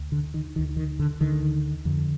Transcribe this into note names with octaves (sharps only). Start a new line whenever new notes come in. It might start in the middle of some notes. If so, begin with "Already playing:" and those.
Already playing: D2
D3
D#3
D2 D3 D#3
D#3
D3
D2 D3 D#3
F2 D3